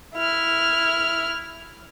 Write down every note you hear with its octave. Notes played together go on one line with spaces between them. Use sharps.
E4 F6